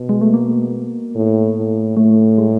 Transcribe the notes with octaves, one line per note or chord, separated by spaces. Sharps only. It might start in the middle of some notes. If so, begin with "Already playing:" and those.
Already playing: B2
G#3
A3
A#3
A2
A2
A2 A3
G#3